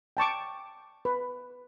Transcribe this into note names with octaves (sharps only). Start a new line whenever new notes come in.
G5 A5 C#6 D6
B4